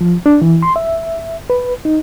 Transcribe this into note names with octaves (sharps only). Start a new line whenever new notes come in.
F3
D4
E3
C6
E5
B4
D#4